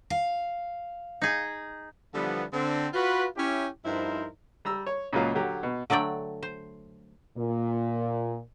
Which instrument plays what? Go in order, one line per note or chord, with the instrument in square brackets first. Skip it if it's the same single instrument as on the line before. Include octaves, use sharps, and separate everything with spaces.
[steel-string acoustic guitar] F5
[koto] D#4 G#4
[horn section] D3 E3 F3 G3 B3
D3 C4
F4 F#4 B4
C#4 E4 G4
G2 F3 D#4 E4 A#4 C5
[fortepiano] G3 A#5 E6
C#5
C#2 A#2 F#3 F4
D3 F#3 G4 A#5
B2
[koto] D3 F#3 A3 D5 G5
C5
[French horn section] A#2